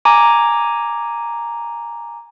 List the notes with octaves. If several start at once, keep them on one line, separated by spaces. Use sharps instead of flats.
G#5 A#5 D6